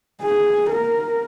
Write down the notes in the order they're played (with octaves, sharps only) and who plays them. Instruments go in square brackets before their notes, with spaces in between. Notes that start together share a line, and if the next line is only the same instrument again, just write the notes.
[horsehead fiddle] G#4
A#4